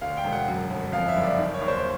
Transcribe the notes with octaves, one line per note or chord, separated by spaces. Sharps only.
D2 F5
G5
E1
F#5
F#2
G1
F2 F5
E5
F#1
D5
D#3
C#5
D#2
C5